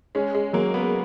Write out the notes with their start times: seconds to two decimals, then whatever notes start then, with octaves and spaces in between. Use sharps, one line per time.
0.15 G#3 C#4
0.35 G#3
0.53 F#3 A#3
0.74 B3